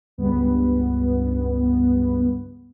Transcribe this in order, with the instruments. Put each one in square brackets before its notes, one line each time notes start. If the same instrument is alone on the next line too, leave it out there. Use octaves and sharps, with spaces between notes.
[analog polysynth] C#2 G2 B3